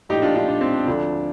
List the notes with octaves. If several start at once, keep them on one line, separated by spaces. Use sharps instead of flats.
A#1 A2 F3 D#4 G4
D4 F4
D4 F4
D4
C4
D4
D2 D3 F3 D4